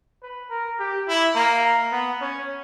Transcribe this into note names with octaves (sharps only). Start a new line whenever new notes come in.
B4
A#4
G4
E4
A#3
B3
C#4